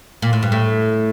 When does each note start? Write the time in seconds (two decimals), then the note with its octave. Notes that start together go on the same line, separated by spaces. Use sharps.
0.22 A#2
0.33 A2
0.43 G2
0.52 A2